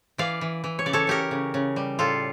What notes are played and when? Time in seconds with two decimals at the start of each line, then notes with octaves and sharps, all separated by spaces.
0.18 E3 D5 F5
0.41 E3
0.64 E3
0.79 C#5
0.86 C#3 D5
0.93 A4 C#5
1.07 C#3 G4 A#4
1.31 C#3
1.54 C#3
1.76 G3
1.99 A2 F4 A4